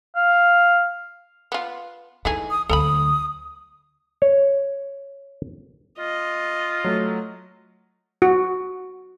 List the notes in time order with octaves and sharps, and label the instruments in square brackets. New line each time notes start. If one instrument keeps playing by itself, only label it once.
[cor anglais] F5
[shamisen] B3 F4
[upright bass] E3 [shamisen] A3 D#4 G#4
[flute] D#6
[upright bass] D2 F#3 [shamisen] A4 A#5 B5 [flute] D#6
[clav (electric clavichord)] C#5
[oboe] F4 [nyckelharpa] D#5
[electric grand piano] F#3 A3
[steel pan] F#4